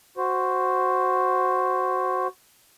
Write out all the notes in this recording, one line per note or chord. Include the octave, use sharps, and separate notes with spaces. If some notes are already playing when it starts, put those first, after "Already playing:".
F#4 C5